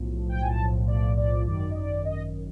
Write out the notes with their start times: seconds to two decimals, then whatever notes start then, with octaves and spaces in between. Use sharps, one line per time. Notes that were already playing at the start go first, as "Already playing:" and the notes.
Already playing: B1 A2 F3
0.29 G5
0.41 G#5
0.48 A5
0.88 D5
1.17 D5
1.46 G#1 F#2 D#3 D5
1.71 D#5
1.75 D5
2.05 D#5